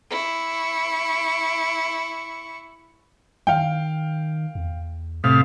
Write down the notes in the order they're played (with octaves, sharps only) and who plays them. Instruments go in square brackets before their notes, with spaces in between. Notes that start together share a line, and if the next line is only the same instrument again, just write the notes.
[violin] E4 C#6
[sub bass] D#3 [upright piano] F5 G5
[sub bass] E2
[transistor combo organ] A2 C3 F5 [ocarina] D#6